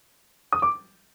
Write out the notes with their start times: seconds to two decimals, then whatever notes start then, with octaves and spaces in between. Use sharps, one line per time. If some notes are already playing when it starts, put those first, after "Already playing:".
0.53 D#6
0.62 D6